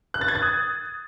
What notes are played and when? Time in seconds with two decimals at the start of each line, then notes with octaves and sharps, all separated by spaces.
0.14 F#6
0.21 A6
0.28 G#6
0.35 A6
0.42 D#6